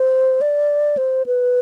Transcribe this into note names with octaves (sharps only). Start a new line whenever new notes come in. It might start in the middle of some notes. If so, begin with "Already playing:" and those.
Already playing: C5
D5
C5
B4